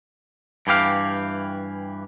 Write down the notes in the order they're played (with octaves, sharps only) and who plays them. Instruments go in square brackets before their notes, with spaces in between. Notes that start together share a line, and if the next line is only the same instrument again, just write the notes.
[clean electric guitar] G2 E3 G4 F5